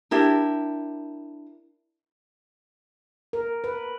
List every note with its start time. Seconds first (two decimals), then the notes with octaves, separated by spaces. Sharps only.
0.11 D4 E4 G4 A#4
3.33 A#4
3.64 B4